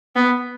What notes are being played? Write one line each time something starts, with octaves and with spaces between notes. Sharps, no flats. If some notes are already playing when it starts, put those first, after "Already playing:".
B3